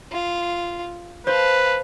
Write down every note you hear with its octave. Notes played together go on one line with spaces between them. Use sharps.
F4
B4 C5 F5 A5